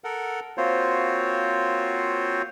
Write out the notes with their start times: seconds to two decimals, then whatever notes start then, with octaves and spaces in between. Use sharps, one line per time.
0.04 A4 A#4 F#5
0.58 A#3 C4 F4 F#4 C5 C#5